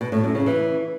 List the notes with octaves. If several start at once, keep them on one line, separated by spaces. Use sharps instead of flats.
B2
A2
F#2
C#3
E3